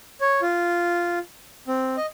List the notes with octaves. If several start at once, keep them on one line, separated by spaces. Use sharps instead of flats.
C#5
F4
C4
D#5